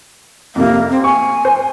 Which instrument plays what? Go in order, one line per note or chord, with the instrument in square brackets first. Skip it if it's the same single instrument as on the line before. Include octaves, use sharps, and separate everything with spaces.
[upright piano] F2 C3 [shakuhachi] A#3
[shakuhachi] C4
[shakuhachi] G#5 [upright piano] C#6
[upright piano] C5